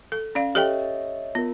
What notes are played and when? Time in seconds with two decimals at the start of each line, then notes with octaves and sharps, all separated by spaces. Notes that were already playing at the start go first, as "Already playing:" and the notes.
0.12 A4
0.35 C#4 D5 F5
0.55 G4 A4 C#5 D#5 E5 G5
1.35 B3 F4 A#4